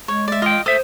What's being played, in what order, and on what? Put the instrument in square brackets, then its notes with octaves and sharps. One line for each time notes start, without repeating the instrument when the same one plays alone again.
[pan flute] G#3 [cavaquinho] C#5
[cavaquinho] D5 E5
[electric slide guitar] F4 G5 [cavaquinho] D#5
[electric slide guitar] A4 E5 [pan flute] C5 [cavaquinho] D#6